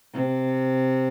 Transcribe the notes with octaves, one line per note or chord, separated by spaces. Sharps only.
C3